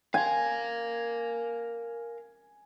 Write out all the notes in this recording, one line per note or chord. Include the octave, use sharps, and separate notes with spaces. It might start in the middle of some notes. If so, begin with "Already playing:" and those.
A#4 F5 G#5